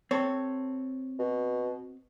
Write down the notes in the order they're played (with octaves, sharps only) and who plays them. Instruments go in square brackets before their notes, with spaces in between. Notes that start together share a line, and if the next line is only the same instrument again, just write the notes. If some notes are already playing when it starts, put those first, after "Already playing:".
[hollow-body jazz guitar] C4 A4 [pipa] C#5
[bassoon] B2